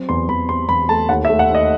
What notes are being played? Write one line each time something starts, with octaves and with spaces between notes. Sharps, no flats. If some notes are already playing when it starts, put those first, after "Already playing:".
Already playing: F#3 C4
E2 C6
E2 B5
C4 C6
E2 B5
A3 A5
D#2 F#5
E5
A3
F#5
D#2
D#5